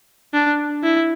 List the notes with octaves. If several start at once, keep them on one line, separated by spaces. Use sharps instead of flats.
D4
E4